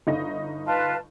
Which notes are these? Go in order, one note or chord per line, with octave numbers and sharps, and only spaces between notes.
G1 D#4 D#5
F4 B4 A5